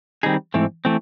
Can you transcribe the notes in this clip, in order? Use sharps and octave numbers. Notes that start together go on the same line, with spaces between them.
D#3 G3 C4 D#4 G#4
G#2 E3 A3 C4
E3 A3 C4